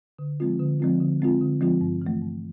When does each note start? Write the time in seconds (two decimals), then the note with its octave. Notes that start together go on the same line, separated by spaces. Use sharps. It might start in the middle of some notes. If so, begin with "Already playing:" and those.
0.19 D3
0.40 F3 G#3 C4 F4
0.59 D3
0.80 F3 G#3 C4 F4
1.00 D3
1.20 F3 G#3 C4 F4
1.41 D3
1.61 F3 G#3 C4 F4
1.81 G2
2.02 E3 A3
2.22 G2